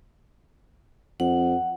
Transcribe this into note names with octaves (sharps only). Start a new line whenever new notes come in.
F2 F#5